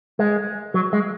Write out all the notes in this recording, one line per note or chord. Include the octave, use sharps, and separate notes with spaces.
G#3
F#3
G#3